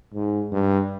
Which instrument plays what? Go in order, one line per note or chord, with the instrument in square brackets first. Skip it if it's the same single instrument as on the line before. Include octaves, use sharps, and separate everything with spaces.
[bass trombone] G#2
G2